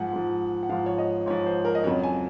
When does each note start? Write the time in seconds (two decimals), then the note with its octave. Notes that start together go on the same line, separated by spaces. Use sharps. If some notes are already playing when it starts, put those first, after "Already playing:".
Already playing: G#2 F3 F#5 G#5
0.13 G#2 F3
0.63 F#5
0.69 G#2 F3 F5
0.86 C#5
0.98 D#5
1.26 G#2 C#5
1.30 F3
1.46 C5
1.65 A#4
1.75 D#5
1.84 F2 C#3 F#3 C#5
2.03 G#5